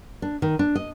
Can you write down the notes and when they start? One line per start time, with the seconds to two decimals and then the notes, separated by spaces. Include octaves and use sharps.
0.22 D4
0.42 D#3
0.59 D4
0.75 D#5